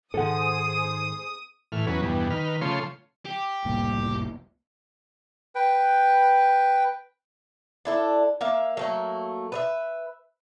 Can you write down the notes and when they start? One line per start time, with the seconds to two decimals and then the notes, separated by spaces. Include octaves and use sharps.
0.14 G#2 D#3 G#4 A4 C5 F#5 D#6
1.72 A2 E3 F6
1.87 E2 F#3 C#4 B4
2.02 E2 G2 B2
2.30 D#3 B4 F6
2.61 C#3 F3 A3 F4 C#5 C6
3.25 G4
3.65 F#1 C2 F2 A2 G3 A#3
5.55 B4 G5
7.85 D4 E4 A4
8.41 A#3 E5 F5
8.77 F#3 A3 A#3
9.52 B4 D5 E5